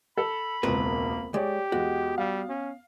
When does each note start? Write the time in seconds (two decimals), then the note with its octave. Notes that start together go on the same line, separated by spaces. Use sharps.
0.18 A4 B5
0.63 E1 C#2 A#3 C4 A#4 B4
1.34 G#3 G4 C#5 D5
1.72 E2 G#3 B3 F#4
2.18 G3 F5
2.49 C#4